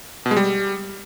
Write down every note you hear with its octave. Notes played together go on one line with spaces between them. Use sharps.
B2
G#3
G3